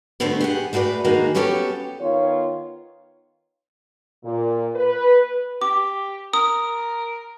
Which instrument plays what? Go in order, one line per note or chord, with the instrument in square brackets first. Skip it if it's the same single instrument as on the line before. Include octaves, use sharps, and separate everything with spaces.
[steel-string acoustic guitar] D3 G3 A3 B3 C4 F#4
G4 G#4 F#5
G#3 A3 F#4 B4 D5
D#3 G#3 A#3 D#4 F#4
B3 C#4 F#4 G4 A4 C#5
[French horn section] D#3 B3 F4 C#5
A#2
B4
[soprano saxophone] G4 [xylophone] D6
[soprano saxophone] A#4 [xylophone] D#6